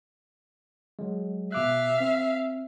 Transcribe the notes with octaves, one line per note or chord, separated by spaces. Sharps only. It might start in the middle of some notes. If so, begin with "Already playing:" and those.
F#3 G#3
B2 E5 F5 D6 F#6
C4